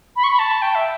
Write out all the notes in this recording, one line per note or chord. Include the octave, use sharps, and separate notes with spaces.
B5
C#6
B5
A5
G5
E5